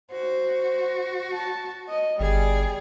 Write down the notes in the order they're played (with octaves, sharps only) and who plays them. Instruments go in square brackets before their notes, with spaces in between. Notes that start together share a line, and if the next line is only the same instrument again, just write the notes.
[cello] F#4 [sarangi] C5
[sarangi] A5
D#5
[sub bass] G1 [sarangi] G3 [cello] G#4 D5